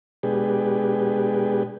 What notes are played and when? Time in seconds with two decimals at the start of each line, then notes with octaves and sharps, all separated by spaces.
0.23 B2 G#3 D4 G4 G#4 B4